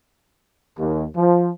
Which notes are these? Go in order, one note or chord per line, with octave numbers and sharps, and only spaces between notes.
D#2
F3